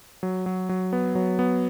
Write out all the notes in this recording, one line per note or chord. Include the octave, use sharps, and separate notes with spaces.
F#3
F#3
F#3
B3
F#3
B3